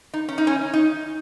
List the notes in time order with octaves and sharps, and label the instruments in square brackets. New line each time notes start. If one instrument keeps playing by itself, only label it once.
[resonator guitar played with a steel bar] D#4
C#4
D#4
C#4
D#4